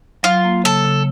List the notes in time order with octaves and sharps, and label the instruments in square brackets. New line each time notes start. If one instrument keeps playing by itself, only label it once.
[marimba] F#3 [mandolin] F4
[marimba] A#3
[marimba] C#3 [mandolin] A4
[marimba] C#3